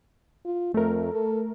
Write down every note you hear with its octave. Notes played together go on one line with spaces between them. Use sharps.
F4
F2 A3 A#4
A4